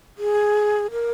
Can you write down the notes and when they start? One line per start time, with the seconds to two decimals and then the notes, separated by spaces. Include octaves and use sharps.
0.18 G#4
0.91 A#4